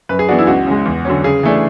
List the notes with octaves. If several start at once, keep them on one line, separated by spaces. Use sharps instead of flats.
F#2 B4
G#4
E3 B3 D4 F#4
E4
C#2 F#4
C#3 G#3
E2
D3 F#3 C#4
C#3 G#4
E3 A3 D4